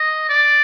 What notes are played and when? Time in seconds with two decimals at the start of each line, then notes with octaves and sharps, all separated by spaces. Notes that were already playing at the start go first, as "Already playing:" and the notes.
Already playing: D#5
0.29 D5